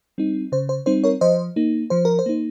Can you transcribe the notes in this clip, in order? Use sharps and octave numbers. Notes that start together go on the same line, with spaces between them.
G3 C4 D#4
C#3 C5
C5
G3 C4 D#4 C5
A#4 C#5
F3 C5 D#5
A#3 D#4
F3 C5
A#4
C5
A#3 D#4